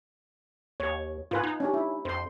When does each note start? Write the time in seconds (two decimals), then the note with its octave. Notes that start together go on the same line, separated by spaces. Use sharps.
0.80 D#2 C#5
1.31 G#2 F4 B4 G#5
1.43 D#4
1.60 C#4 D4 G4
1.74 E4
2.05 F2 C5 C6